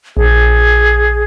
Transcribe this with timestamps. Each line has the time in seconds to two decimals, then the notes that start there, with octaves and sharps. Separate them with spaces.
0.17 A#1 G#4